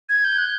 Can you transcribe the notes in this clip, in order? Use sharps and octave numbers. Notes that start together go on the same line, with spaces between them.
G#6
G6
F#6